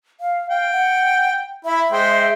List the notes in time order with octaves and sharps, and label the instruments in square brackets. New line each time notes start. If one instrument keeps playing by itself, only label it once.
[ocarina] F5
[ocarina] F5 [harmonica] G5
[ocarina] F#5
[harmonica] E4 B5 [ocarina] E5
[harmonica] G#3 C5 G5